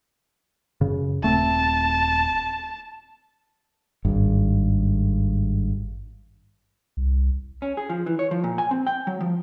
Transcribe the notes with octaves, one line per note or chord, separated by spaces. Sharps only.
F#2 C#3
D#1 A3 C4 A5
G#1 G2
C2
C#4
G#4
F3
E3
C#5
F3
A#2
G#5
C4
G5
F#3
F3